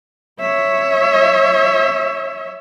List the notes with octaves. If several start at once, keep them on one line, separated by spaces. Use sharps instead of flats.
C#5 E5